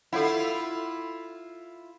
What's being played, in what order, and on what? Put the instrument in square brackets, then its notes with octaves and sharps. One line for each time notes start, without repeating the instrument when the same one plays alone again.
[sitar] E4 F4 [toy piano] A4 C#5 F#5